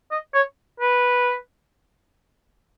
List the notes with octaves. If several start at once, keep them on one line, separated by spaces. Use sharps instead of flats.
D#5
C#5
B4